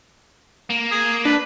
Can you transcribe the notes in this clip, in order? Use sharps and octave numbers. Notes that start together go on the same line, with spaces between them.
A#3
G#4
D4 B4